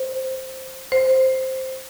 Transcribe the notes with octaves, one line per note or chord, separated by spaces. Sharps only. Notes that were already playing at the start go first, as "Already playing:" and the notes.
Already playing: C5
C5